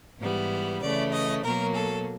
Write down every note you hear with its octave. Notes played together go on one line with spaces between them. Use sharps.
G#2 E3 G3 B3
C#3 E3 A3 D5
D#5
B2 F#3 A#3 A#4
A4